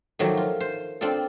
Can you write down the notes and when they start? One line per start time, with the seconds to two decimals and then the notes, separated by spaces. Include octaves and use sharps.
0.19 D#3 F3 F#3 A3 A#3
0.37 F4
0.61 C5
1.01 C4 D4 F4 A4